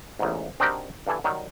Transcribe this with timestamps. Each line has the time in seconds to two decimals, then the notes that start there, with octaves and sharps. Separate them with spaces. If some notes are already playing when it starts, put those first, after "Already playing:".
0.19 A1 E2 G#2
0.60 C4 D4 D#4 F#4 G4 A#4
1.07 G2 E3 A4 G#5
1.24 D#3 F#3 G3